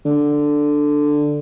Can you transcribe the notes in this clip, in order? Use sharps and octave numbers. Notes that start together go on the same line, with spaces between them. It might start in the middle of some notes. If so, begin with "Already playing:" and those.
D3